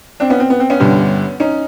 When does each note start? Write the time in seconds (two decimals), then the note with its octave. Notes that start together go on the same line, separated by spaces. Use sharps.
0.20 C4 D4
0.30 B3 C#4
0.40 C4
0.50 B3
0.60 C4
0.70 B3 C#4
0.80 G1 G2 D3 G3
1.40 C#4 D#4